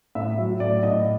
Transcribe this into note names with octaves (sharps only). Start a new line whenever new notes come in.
A2 E5
F#3
A2 D5
A2 D#5